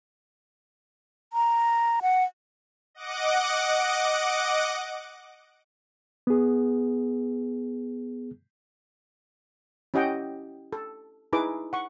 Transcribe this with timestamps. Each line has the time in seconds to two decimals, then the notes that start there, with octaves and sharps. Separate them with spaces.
1.33 A#5
2.02 F#5
2.95 D#5 F#5 D6
6.27 B3 G#4
9.94 C#4 E4 G4 D#5 F#5 G5
10.73 A4
11.33 D#4 E4 G#4 B4 D6
11.73 F#5 C#6